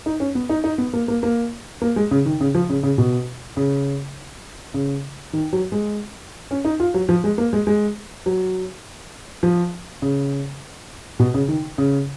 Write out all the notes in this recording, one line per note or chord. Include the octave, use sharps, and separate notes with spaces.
D#4
C#4
B3
D#4
D#4
B3
A#3
A#3
A#3
A#3
G#3
C#3
D#3
C#3
F3
C#3
C#3
B2
C#3
C#3
D#3
F#3
G#3
C#4
D#4
F4
F#3
F3
G#3
A#3
G#3
G#3
F#3
F3
C#3
B2
C#3
D#3
C#3